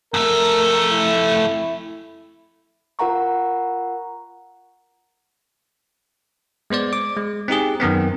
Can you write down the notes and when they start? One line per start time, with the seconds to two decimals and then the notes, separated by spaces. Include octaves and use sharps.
0.14 F2 A3 A#4
0.91 E4
2.99 F4 A#4 F#5 A#5 C#6
6.70 G#3 B3 C5 D5
6.93 D6
7.17 G#3
7.48 C4 D#4 G4 G#4
7.80 F#2 D#3 B3 C4